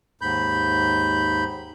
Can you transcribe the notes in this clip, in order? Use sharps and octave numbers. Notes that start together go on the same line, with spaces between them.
D#2 G#2 B5 G6